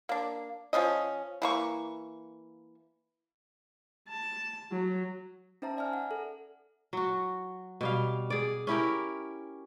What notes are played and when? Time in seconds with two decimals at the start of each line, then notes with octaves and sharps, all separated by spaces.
0.09 A#3 D4
0.73 F3 C4 C#4 D#5
1.42 E3 A#3 C#6
4.09 A5
4.72 F#3
5.62 C#4 D#4 C5 E5 A5 A#5
5.77 D5 E5 G#5 F6
5.93 F#5
6.11 A4
6.93 F#3 F#4
7.81 B2 G3 F5
8.30 G#4 D5
8.67 C#4 E4 G4 A#4